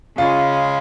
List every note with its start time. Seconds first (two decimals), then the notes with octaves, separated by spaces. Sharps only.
0.17 C#3 G#3 C#4 F4